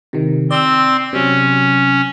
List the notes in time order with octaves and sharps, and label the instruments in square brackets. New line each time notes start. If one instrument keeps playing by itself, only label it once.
[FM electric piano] C3 D#3
[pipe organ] C4 C6 [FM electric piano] D5 E6
[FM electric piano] C3 F#3 [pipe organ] C#4